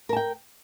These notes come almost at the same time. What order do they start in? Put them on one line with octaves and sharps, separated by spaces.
A#4 A5 G5